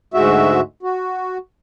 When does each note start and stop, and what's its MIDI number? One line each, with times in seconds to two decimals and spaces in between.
0.14 0.60 38
0.14 0.60 44
0.14 0.60 56
0.14 0.60 66
0.14 0.60 76
0.83 1.38 66